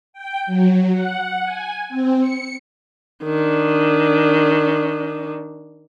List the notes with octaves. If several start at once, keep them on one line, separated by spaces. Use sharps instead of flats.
G5
F#3
F#5
G#5
C4
C#7
D#3 D4